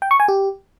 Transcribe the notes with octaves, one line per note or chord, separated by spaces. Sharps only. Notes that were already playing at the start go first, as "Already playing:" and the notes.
G5
C#6
G#5
G4